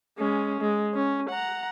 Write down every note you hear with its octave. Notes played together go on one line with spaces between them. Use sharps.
G#3 C#4
G#3
C#4
F#5 A#5